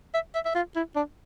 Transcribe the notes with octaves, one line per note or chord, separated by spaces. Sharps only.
E5
E5
E5
F4
E4
D4